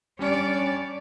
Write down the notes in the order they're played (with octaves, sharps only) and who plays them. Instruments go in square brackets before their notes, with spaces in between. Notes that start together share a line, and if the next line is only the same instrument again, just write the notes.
[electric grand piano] G3 C#4 D4 [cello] C#5 D5